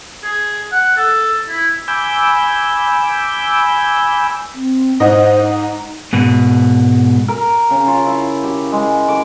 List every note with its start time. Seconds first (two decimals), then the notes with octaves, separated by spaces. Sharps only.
0.23 G#4
0.72 F#5
0.97 A4
1.49 E4
1.88 G#5 B5 D6 E6 G6
4.55 C4
5.00 G#2 C5 D#5 F#5
5.42 D#4
6.13 G#2 B2
7.28 A#4
7.70 C#3
7.87 F4
8.07 E4
8.44 G4
8.72 G#3
9.08 D6